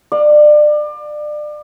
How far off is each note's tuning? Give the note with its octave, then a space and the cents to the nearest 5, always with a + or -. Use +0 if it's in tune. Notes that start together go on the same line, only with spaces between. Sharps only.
D5 +30 F5 +30